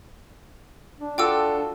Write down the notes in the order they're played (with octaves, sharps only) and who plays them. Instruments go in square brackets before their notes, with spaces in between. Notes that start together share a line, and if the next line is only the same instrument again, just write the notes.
[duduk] D4
[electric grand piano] F4 F#4 A4 [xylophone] G5 D6 E6